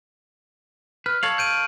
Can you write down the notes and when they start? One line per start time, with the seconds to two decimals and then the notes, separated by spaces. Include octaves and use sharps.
1.06 B4 F6
1.23 A4 C#5 F5 F#7
1.38 G6 D7 D#7